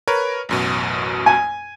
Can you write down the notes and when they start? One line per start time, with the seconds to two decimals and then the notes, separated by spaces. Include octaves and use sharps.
0.08 A#4 B4 C#5
0.49 A1 F#2 B2
1.26 G#5